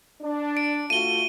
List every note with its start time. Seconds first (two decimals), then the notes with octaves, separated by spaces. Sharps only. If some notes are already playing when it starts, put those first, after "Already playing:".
0.21 D4
0.57 D7
0.90 A3 F4 F#4 D#7 G7